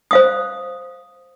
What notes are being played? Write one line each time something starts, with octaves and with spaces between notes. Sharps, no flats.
C5 F5 D#6